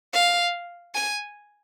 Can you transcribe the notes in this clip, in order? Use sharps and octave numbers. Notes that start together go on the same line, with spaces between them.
F5
G#5